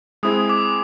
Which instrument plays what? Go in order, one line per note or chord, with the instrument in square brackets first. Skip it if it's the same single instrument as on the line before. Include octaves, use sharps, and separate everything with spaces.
[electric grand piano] G#3 C4 E4 G#4 [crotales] D#6
[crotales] D6